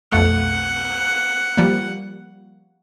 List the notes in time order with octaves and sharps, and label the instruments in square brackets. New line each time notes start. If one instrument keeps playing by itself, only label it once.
[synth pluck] B1 F2 A3 [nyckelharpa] F#5
[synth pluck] F3 G3 A#3